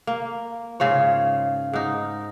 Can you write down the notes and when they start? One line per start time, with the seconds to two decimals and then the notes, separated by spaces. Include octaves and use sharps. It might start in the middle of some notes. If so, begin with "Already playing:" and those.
0.07 A#3
0.80 G#2 C#3 F4 C#5
1.73 G#2 D#4